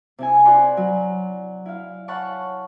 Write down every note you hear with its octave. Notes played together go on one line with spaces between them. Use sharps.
C3 E4 G#5
E4 F#4 D5 B5 C6
F#3
E4 F5
C#5 F5 F#5 A5 B5 C#6